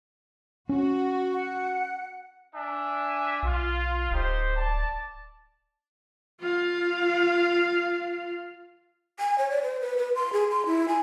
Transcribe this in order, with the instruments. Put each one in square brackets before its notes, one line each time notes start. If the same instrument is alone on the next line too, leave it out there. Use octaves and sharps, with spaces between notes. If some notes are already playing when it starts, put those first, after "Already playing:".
[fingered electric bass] C#4 [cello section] F#4
[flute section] F#5
[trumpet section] D4 E5 G#5
[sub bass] B1 [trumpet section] F4
[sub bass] D1 [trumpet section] D#4 G4 C5
[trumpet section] D5 A5
[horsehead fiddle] F4 F5
[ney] G#5
C#5
D5
C5
B4
B4
C6
G#4
C6
E4
G#5